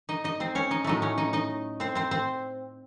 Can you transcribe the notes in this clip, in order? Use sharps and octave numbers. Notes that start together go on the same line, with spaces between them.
D#4 D#5
D#4 D#5
C4 C5
C#4 C#5
D#4 D#5
A2 F#3 A3 D#4 D#5
C#4 C#5
D#4 D#5
D#4 D#5
C4 C5
C4 C5
C4 C5